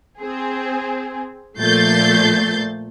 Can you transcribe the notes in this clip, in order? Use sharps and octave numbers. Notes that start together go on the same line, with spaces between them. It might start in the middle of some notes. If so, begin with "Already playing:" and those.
C4 G#4
A#2 F3 A3 G6 A6 C7